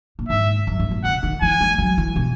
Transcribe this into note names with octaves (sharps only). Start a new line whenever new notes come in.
A#2
G#2 E5
F#2
G#2
A#2
C#3 F#5
D#3
E3 G#5
G#3
F#3
E3
B2